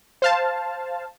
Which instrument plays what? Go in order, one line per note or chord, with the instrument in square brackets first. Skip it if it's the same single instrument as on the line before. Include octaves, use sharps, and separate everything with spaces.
[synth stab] C5 F5 A5